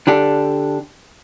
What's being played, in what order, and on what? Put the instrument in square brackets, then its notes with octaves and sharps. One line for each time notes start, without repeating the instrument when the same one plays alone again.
[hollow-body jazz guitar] D3 D4 G4 A4